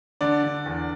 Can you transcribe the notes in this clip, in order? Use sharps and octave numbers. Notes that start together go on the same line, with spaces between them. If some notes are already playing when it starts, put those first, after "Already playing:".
D3 D5
D3
E2